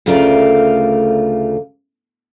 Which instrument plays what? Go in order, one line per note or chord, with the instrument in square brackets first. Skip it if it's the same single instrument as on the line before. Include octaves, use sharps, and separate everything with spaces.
[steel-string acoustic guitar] D2 C#3 A3 F4 A#4 D5